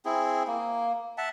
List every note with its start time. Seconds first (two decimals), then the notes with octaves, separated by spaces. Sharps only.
0.05 C4 E4 G#4
0.48 A#3
1.18 E5 F#5 A5